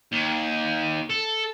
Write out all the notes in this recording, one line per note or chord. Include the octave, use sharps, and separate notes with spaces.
D#2
A4